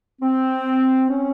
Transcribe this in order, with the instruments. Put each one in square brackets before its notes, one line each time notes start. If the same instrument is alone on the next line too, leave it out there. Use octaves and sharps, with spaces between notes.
[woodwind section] C4
C#4